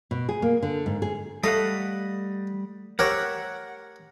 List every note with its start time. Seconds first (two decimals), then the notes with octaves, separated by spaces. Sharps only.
0.11 B2
0.29 G#4
0.42 A#3
0.63 D3
0.86 G#2
1.02 G#4
1.44 G3 A3 D#5 F5 F#5
2.99 G4 A#4 C#5 E5 F#5